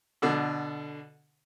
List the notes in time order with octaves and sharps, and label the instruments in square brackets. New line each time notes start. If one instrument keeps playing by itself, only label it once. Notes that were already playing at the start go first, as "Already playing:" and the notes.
[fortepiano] B2 D3